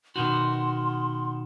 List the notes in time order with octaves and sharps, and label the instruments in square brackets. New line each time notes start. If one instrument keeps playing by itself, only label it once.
[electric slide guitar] B2 D#3 F#4 [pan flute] C6